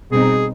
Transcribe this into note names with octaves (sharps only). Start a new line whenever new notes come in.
B2 G3 C4 D#4 G#4